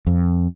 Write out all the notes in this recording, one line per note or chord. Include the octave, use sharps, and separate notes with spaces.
F2